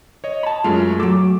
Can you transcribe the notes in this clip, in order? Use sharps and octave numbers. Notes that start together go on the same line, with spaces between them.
C#5 D#5
A5 B5
F#2 G#3 A3 F4
F#3 A3 A4 D6